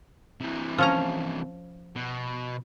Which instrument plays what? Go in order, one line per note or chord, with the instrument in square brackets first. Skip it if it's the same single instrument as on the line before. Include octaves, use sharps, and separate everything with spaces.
[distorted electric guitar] C3 E3
[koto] F3 C#4 A#5
[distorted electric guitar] B2